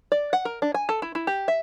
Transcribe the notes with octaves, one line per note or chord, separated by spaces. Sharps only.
D5
F#5
A#4
D4
G#5
A4
E4
E4
G4
E5